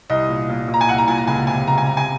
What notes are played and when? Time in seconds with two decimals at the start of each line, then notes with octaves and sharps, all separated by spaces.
0.10 C2 D#5
0.29 A#2
0.49 A#2
0.68 A#2
0.74 A#5
0.81 G#5
0.88 C2 F#5
0.98 A#5
1.08 A#2 G#5
1.18 A#5
1.27 C#2 G#5
1.47 C3 G#5
1.67 C#2 A#5
1.78 G#5
1.87 C3 A#5
1.97 G#5